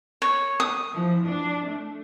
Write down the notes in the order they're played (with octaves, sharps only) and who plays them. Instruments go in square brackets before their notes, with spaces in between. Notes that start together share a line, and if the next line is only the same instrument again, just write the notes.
[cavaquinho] C#5
D#6
[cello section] E3 F3
D4
A3